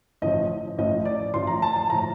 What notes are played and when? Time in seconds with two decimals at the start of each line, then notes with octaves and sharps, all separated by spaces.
0.22 A1 A2 F3 D#5
0.77 A1 A2 F3 D#5
1.05 D5
1.34 A1 A2 F3 C6
1.47 A#5
1.62 A5
1.76 A5
1.90 A2 F3 A#5